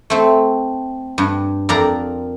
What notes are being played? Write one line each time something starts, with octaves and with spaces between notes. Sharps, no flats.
A3 C4
G2
F2 A#4 D5 A#5